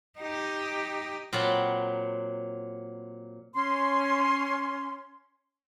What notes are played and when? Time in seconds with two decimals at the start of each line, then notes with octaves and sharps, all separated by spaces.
0.19 D#4 G4
1.33 A#2 F#3 C4 F#5 A5 B5
3.54 C#4 C6